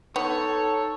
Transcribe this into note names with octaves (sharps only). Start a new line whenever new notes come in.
B3 D#4 A4 C#5